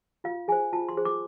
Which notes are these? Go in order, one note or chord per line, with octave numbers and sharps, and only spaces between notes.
F4 F5
G#4 C5 G#5
F4 A5
C6
G#4 C5
D6